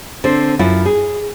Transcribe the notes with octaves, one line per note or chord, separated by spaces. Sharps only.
D3 C4 C5
F#2 E4 F4
G#4